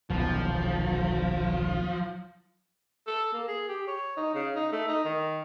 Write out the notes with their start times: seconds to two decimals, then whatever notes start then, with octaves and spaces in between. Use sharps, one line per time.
0.10 D#1 B1 E2 F3
3.07 A4
3.33 A#3
3.48 G#4
3.69 G4
3.88 C#5
4.17 D#4
4.35 C#3
4.55 D#4
4.72 A3
4.88 D#4
5.05 D#3